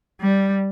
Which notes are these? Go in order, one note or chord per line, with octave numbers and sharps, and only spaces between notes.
G3